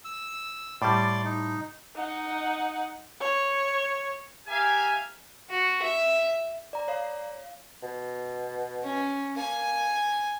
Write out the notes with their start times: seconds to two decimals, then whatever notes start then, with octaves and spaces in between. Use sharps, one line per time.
0.05 E6
0.82 A2 G3 D5 C6 D6
1.25 D#4
1.96 D#4 F#5
3.20 C#5
4.47 G4 A#4 E5 F5 G#5
5.50 F#4
5.82 E5
6.73 D5 A#5
6.88 C#5 F5
7.82 B2
8.83 C#4
9.36 A#3 G#5